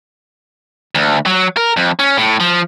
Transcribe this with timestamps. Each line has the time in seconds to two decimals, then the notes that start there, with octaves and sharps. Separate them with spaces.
0.95 D2
1.26 F#3
1.57 A#4
1.77 F2
1.99 C#4
2.17 A2
2.40 F3